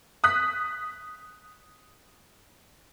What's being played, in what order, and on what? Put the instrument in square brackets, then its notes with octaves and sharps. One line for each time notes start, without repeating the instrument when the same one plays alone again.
[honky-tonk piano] D#6 F#6 B6